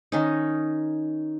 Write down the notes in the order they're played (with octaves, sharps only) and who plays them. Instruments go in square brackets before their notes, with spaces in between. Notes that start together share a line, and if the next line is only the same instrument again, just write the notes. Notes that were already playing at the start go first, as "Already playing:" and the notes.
[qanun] D#3 C#4 D#4